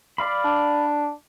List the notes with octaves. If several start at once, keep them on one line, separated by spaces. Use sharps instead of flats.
D5 F5 B5
D4